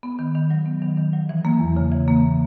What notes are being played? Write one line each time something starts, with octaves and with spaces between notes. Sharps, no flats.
B3
D#3
D#3
F#3
B3
D#3
D#3
F#3
E3
A#3
E2
C#3
E3
A#3